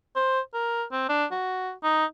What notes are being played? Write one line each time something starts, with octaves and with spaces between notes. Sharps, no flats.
C5
A#4
C4
D4
F#4
D#4